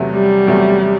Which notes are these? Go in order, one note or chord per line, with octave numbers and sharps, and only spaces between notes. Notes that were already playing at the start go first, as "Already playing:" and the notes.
Already playing: E2 C3 F#3 A3
G3
E2 C3 F#3 A3